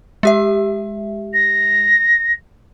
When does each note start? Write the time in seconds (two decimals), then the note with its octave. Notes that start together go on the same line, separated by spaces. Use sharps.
0.23 G#3 G4 E5
1.34 A#6